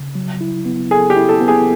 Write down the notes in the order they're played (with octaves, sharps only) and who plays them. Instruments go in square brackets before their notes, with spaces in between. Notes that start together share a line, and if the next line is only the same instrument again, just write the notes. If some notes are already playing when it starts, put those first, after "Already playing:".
Already playing: [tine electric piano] C#3
F#3
E4
B3
[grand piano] G#4 [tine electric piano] A4
[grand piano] G4
[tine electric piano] E4
[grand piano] A4
[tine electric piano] B3
[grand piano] G#4